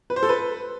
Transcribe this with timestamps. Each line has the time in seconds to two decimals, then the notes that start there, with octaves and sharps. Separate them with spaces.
0.10 B4
0.16 C5
0.23 A4
0.29 B4